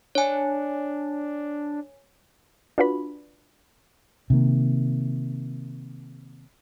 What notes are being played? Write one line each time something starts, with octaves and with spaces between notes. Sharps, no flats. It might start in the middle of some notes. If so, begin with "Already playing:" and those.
D4 C#5 G#5
D4 F4 F#4 B4 B5
C3 D#3 A#3